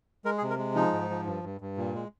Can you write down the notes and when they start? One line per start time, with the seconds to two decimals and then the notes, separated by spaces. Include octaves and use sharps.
0.25 G#3 A#4
0.38 G#4
0.42 C3
0.50 A#4
0.58 G#3
0.75 F3 D#4
0.93 G#2
1.10 F3
1.27 G2
1.44 G2
1.61 G2
1.77 A#2
1.95 G#3